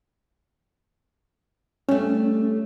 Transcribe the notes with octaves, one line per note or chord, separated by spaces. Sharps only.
G3 A3 C#4